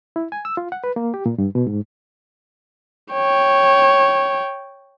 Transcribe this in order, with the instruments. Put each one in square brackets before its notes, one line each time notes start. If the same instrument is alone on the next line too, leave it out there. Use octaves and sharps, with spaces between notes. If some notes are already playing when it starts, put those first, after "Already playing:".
[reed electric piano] E4
G#5
E6
F4
F#5
B4
A#3
G4
A#2
G2
B2
G#2
[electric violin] C#5 G5